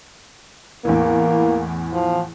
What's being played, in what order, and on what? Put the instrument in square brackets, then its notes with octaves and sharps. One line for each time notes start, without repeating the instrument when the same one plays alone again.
[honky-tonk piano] E2 A2 E3 [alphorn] A#3
[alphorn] F3